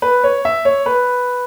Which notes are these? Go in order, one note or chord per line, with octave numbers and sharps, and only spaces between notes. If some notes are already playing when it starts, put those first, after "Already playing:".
B4
C#5
E5
C#5
B4